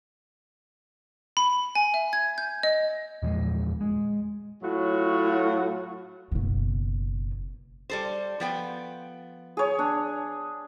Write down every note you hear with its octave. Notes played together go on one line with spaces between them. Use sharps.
B5
G#5
E5
G#6
G6
D#5
E2 A#2 F3 G#3
G#3
A2 F#3 F4 F#4
F#1 B2
G3 A4 C5
F3 B3 G5
G#4 C#5
D4